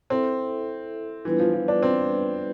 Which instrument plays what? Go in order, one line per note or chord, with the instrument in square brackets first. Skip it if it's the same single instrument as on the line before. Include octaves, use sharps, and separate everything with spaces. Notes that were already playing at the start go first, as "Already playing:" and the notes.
[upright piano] C4 [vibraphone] E4 A4 E5
[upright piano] E3 [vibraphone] G3 B3 D4 F4 B4
[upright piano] F3
F3
D4
C4